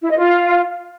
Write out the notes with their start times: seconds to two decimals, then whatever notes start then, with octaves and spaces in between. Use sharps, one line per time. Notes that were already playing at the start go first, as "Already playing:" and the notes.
0.02 E4
0.10 D#5
0.18 F4